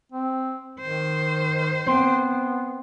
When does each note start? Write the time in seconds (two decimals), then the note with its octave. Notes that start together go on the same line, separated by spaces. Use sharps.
0.12 C4
0.81 D#3 C5
1.86 B3 C4 C6 D7